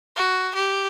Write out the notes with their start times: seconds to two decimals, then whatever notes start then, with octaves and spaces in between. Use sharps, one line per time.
0.16 F#4
0.55 G4